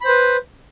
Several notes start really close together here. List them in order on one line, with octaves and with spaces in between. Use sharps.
B5 C5 B4